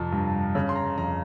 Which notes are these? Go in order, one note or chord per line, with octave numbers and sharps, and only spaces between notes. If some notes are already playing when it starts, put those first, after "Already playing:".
Already playing: F2 C3 F3
G2
C#3
C6
A#5
F2 A#5